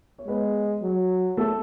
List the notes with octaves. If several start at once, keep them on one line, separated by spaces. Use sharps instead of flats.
C#5
G#3 B3 B4
F#3
A3 A4